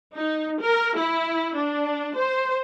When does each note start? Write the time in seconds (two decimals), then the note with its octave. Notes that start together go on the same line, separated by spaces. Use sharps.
0.15 D#4
0.60 A#4
0.98 E4
1.55 D4
2.17 C5